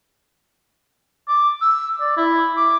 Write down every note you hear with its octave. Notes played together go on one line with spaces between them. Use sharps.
D6
E6
D5
E4
D6